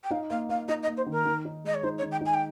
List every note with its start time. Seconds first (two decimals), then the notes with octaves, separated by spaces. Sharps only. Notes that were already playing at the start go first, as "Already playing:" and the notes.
0.04 G5
0.11 D#4 F5
0.30 A#3 F5
0.49 A#3 F5
0.68 D#4 D#5
0.83 D#5
0.87 A#3
0.97 C5
1.06 D#3
1.12 A#4
1.25 D#3
1.45 D#4
1.64 G#3 D#5
1.74 C#5
1.83 D#4 C5
1.98 C#5
2.02 D#3
2.12 G5
2.21 D#4 G#5
2.34 G5